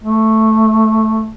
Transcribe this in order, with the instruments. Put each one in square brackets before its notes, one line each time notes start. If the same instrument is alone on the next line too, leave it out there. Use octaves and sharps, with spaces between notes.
[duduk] A3